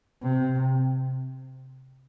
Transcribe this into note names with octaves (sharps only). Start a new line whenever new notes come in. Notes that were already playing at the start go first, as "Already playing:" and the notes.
C3